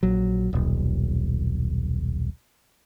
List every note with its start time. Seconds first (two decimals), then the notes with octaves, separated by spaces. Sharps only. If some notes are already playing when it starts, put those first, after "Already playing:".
0.03 A#1 F#3
0.53 D#1 B1